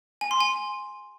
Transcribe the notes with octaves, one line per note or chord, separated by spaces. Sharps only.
G#5
C6
G#5